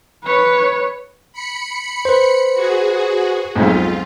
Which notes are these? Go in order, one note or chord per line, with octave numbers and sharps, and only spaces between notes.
B4 C#5
B5 C#7
B4 C5
F#4 G#4
B1 F2 G#2 F4